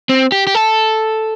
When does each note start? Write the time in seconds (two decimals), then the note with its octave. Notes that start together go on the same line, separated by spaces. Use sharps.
0.09 C4
0.32 G4
0.47 G4
0.55 A4